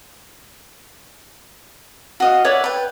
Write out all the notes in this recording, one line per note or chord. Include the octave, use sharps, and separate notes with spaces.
F#4 D#5 F5
C#5 D5 E5 F#5
B4 G5